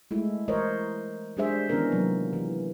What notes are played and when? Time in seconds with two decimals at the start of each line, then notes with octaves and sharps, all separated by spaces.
0.11 G#3 A3 E4
0.48 E3 A#4 C5 C#5 D#5
1.37 G3 G#3 D4 G#4 C5 E5
1.69 D#3 E3 B3 C#4 D4 A#4
1.92 C3 F3 F#3 A#3
2.33 E3